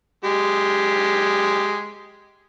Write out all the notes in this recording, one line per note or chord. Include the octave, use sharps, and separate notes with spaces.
G#3 G4